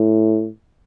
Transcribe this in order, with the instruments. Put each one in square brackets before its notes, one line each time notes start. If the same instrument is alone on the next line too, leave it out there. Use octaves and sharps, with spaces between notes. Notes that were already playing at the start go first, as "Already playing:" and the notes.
Already playing: [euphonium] A2